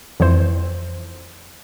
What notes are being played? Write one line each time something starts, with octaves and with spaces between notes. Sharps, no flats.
F2 E3 C5